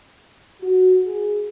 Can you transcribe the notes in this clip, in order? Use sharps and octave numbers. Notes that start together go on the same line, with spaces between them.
F#4
G#4